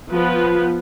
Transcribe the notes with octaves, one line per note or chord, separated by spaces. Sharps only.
F3 B3 F4 B4